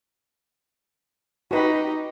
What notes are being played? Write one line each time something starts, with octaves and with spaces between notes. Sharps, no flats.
D#4 F#4 G4 B4 B5